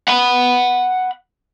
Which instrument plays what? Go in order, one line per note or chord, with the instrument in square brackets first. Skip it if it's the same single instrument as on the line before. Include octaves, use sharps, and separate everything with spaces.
[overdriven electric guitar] F#5 B5